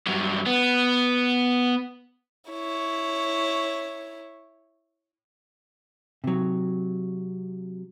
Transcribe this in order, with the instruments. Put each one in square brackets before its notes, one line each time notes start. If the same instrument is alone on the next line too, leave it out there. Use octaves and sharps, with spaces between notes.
[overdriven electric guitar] G2 F#3
B3
[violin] E4 C#5
[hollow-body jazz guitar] C3 F#3